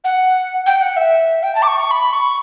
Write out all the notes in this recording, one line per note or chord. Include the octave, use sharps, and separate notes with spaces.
F#5
G5
F#5
E5
G5
A5
D6
C#6
C#6
B5
C#6